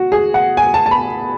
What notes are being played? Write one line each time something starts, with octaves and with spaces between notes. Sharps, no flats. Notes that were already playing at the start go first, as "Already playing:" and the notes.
Already playing: F#4
G#4
F#5
G#5
A5
A5
B5